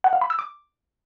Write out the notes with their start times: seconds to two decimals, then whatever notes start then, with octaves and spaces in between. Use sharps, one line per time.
0.04 F#5
0.13 F5
0.21 B5
0.30 E6
0.39 D6